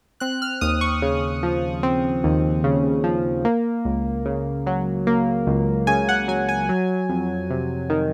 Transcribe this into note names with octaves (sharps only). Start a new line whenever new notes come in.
C4 F#6
F6
D#2 D#6
C#6
C#3
F3
C4
D#2
C#3
F3
A#3
C#2
C#3
F#3
A#3
C#2
C#3 G#5
F#5
F#3 G#5
G#5
F#3
F2
C3
D#3